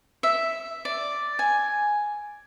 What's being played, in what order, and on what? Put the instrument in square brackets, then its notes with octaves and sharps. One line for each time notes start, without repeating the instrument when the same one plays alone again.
[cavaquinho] E5
D5
G#5